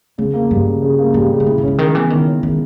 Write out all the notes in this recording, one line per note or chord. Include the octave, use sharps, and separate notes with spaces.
E2 C#3
A#3
G2 G3
C#3
C#3
A#3
G#2 G3
C#3
G#2
A#2 E4
G#2
C#3 C#4
D#3 G#3
B2 E3
D#3 E4
C#4
D#3 G#3